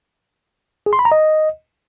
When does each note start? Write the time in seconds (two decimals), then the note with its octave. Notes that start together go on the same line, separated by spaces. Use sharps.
0.86 G#4
0.93 C6
0.99 B5
1.05 A#5
1.12 D#5